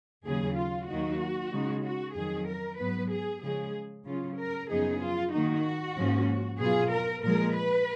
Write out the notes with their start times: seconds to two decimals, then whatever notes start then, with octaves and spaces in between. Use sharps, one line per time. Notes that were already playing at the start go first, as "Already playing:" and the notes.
0.24 D#2 C#3 F#3 G#4
0.56 F4
0.89 D#2 D#3 F#3 A#3 D#4 F#4
1.52 C#3 G#3 D#4
1.83 F#4
2.15 F2 D#3 F#3 G#4
2.48 A#4
2.79 G#2 F#3 B3 B4
3.10 G#4
3.42 C#3 F3 G#3 G#4
4.05 C#3 F#3 C#4 F4
4.38 A#4
4.70 F#2 C#3 F3 B3 D#4 G#4
5.01 F4
5.32 D#3 A#3 D#4 F#4
5.97 G#2 F3 A#3 C#4
6.59 B2 F#3 B3 F4 G#4
6.91 A#4
7.23 A#2 F3 G#3 A#4
7.54 B4